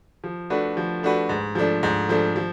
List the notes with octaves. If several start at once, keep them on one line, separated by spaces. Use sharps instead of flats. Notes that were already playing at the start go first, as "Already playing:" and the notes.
F3
A3 D4 F#4 B4
F3
A3 D4 F#4 B4
G#2
F3 A3 D4
G#2
F3 A3 D4
F3